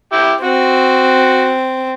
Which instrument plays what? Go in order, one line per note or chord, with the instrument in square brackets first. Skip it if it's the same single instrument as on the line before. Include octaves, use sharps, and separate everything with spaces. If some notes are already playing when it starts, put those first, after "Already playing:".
[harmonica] E4 G4
[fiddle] C4 [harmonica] F#4